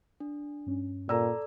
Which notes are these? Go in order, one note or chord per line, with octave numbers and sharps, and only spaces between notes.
D4
G2 C#4
A#2 A4 D5 A#5 E6